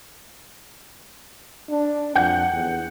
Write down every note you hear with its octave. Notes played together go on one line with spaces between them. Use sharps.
D4
F2 F#5 G6
E2